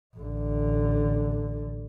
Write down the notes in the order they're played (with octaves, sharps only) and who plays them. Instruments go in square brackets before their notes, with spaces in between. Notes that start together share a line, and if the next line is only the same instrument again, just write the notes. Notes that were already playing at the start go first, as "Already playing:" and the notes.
[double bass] A1 D3